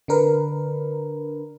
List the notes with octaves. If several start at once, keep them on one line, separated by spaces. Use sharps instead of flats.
D3 D4 A#4 B4